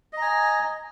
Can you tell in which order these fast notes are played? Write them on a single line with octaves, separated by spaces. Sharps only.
D#5 A#5 G#5